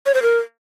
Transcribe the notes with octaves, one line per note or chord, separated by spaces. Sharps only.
C#5
C5
A#4